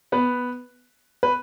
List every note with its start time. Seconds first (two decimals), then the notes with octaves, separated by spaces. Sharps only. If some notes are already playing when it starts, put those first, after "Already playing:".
0.12 B3 B4
1.23 B4